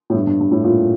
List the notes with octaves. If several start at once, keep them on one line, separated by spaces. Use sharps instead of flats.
A2
G2
G2
G2
A2
A#2